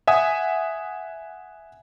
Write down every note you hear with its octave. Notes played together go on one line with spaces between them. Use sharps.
E5 F#5 G#5 D#6